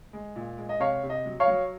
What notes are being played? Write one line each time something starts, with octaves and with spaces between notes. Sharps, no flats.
G#3
A#2
G#3
D#5
C3 C#5 F5
C3
D#5
F#3
C#5 F5
F#3